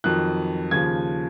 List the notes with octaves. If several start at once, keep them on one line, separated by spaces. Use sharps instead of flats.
F2 D#3 F#3 F#6
D#2 C#3 F3 G#6